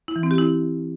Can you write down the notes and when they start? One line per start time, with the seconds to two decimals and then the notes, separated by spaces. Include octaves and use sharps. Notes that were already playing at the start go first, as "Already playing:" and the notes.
0.08 E4
0.16 E3
0.23 C4
0.31 G4
0.38 E4